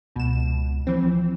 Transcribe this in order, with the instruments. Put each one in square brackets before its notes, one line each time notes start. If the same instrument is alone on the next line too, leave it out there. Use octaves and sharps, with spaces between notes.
[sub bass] C#2 [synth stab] B2 E7
[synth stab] E3 C4 [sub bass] F3